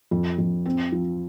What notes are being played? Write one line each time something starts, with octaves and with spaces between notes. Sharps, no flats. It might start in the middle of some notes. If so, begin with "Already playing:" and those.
F2
F2
C4
F3